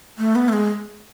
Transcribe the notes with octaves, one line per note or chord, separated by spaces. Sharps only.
A3
B3
A3
G#3